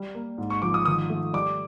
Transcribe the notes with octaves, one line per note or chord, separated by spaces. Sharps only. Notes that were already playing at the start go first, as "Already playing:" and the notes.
Already playing: G3
A#3
G#2
C#6
F3 D6
D#6
D#3 D#6
A3
G3 D6